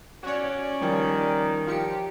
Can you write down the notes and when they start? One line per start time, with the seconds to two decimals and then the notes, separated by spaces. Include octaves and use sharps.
0.23 C#4 F#4 C#5 D5
0.81 D#3 F3 G3
1.67 F3 G4 C#7